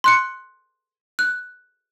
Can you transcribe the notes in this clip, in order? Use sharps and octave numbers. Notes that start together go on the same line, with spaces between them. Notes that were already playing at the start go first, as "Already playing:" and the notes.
C6 F#6 C#7
F#6